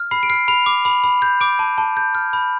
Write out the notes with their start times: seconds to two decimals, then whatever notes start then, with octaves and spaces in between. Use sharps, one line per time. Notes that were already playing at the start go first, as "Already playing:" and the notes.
Already playing: F6
0.11 B5 C7
0.23 D7
0.30 F6 C7
0.48 B5 F7
0.66 D6
0.85 B5
1.04 B5
1.22 G6
1.41 D6 D7
1.59 A5
1.78 A5
1.97 G6
2.15 F6
2.33 B5